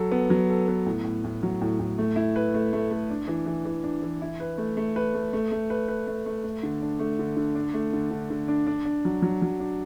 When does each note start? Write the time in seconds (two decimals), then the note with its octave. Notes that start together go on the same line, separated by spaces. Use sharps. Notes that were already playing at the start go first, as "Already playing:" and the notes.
Already playing: F#3 A4
0.12 B3
0.30 F#3
0.50 A4
0.68 B3
0.86 A2
1.04 A2
1.24 A2
1.43 F#3
1.61 A2
1.79 A2
1.98 A3
2.16 E4
2.36 B4
2.54 A3
2.73 A3
2.91 A3
3.10 D4
3.28 E3
3.46 E3
3.65 E3
3.84 D4
4.02 E3
4.22 E4
4.40 B4
4.58 A3
4.77 A3
4.96 B4
5.14 A3
5.33 A3
5.52 A3
5.70 B4
5.88 B4
6.07 A3
6.26 A3
6.44 A3
6.63 D3
6.82 D4
6.99 A3
7.19 D3
7.37 D3
7.55 D4
7.74 A3
7.93 D3
8.11 D3
8.30 D3
8.48 D4
8.67 D4
8.85 D4
9.05 F#3
9.22 F#3
9.42 F#3
9.60 D4